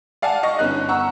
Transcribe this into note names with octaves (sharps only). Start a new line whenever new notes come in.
D5 F5 F#5 G#5 A5
D#5 C#6 A#6
G1 B3 C#4 D#4 F#6
F#5 A#5 C#6 E6